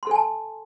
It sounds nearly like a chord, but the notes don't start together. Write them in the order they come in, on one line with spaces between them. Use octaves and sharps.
C6 A4 G#5 A5